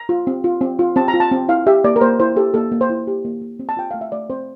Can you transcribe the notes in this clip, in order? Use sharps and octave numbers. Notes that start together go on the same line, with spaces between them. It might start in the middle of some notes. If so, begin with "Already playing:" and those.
Already playing: A#5
F4
C4
F4
C4
F4
C4 A5
A#5
F4
A5
C4
E4 F5
G4 E5
A#3 D5
A#4
A#3 C5
E4 C5
G4 A4
A#3 A4
A#3
C5
E4
G4
A#3
A#3
C4
A5
F4 G5
A3 F5
E5
A3 D5
C4 C5